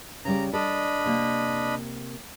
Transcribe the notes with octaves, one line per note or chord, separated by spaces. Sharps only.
C#3 G3 D5 A#5
D4 A4 D5 D#5 B5
C3 A#3